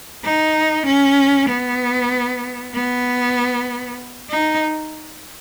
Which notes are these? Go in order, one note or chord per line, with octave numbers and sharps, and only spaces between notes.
D#4
C#4
B3
B3
D#4